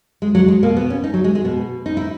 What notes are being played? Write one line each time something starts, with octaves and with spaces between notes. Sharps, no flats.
G#3
F#3
G#3
B2 A#3
B3
C#4
D#4
F#3
G#3
G#3
B2 B3
D#4
E4